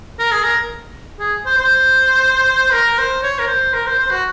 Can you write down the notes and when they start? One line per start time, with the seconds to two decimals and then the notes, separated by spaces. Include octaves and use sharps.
0.19 A#4
0.32 G#4
0.43 A#4
1.20 G#4
1.46 C5
1.57 C5
2.72 A#4
2.98 C5
3.23 C#5
3.39 A#4
3.47 C5
3.73 A#4
3.86 C5
3.99 C5
4.11 F#4